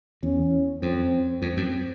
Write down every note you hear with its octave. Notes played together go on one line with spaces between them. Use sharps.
E2 C#4
F2 C4
F2 C4
F#2